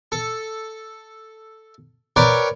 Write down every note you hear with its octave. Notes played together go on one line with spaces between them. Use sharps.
A4
A#4 B4 C#5 D5 G5